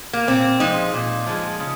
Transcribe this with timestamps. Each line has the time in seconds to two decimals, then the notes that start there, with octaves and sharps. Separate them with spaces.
0.13 A#3
0.28 A#2 C4
0.60 F3 G#3 D#4
0.94 A#2
1.26 F3 G#3
1.60 C#3